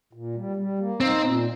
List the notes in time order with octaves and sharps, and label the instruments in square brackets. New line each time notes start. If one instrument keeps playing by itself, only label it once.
[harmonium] A#2
G3
G3
A#3
[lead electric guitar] C4 [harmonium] D#4
[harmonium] A#2